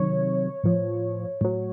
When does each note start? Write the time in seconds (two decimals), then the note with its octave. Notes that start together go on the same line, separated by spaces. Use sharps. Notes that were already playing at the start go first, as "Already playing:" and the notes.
Already playing: C3 D#3 F#3 C#5
0.63 A2 F3
1.41 A2 F#3